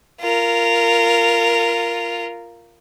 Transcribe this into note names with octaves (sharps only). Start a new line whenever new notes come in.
F4 A#4